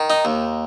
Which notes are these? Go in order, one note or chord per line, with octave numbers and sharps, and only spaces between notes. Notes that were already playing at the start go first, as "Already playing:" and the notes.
Already playing: D#3
D#4
D#2